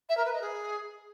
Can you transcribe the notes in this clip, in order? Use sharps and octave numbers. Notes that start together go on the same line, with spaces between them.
E5
A#4
B4
D#5
G#4